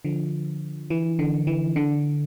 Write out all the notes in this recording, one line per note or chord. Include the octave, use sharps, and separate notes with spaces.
D3 F3
E3
D3
E3
D3